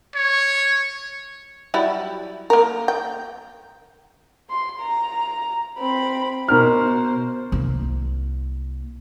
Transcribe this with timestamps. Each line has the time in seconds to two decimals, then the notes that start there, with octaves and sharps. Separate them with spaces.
0.15 C#5
1.74 F#3 G3 E4
2.50 A#3 A#4
2.88 G5
4.50 C6
4.81 A#5
5.79 C4 B5
6.48 B2 A#4 C5 F6
7.52 C2 A#3